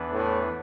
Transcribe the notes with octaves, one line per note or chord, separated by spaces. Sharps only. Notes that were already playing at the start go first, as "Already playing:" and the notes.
Already playing: E2 E3 B3 D4 B4
A2